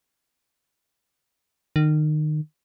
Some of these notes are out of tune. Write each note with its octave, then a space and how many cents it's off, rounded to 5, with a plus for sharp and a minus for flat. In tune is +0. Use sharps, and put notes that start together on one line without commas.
D#3 -30